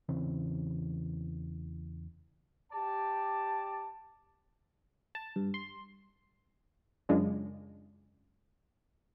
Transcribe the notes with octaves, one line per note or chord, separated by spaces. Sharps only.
E2 C#3 E3 C4
G4 D5 A5
A5
G2
C6
F#2 C#3 G#3 D4 F4